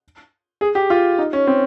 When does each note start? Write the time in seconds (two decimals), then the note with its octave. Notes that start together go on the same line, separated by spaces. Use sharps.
0.61 G#4
0.75 G4
0.90 F4
1.19 D#4
1.33 C#4
1.47 C4